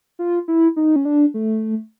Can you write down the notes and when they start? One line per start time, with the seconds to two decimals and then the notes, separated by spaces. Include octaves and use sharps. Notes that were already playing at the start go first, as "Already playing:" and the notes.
0.19 F4
0.48 E4
0.76 D#4
0.96 C#4
1.05 D4
1.34 A3